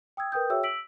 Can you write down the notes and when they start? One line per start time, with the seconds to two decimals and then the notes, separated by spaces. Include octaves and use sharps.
0.17 G5 D#6 E6 G#6
0.32 A#4 B4 G5 D#6 G6
0.50 F#4 G#4 C#5 E5 G5 E6
0.63 E6 B6 D7 F#7